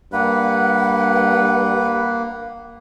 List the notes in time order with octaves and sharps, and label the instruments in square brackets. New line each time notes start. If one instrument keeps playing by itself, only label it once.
[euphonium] G2 [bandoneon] A#3 [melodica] B4 [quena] F#5